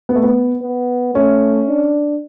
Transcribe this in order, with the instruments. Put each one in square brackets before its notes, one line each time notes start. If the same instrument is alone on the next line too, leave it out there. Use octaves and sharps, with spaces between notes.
[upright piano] B3
A3
B3
[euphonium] B3
[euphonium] A3 [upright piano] C#4
[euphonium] D4